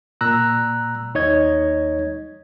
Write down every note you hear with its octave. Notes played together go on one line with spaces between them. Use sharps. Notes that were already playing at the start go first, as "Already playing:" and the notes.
A#2 A#5 E6 F#6
D#2 D#4 C#5 D#5 G#6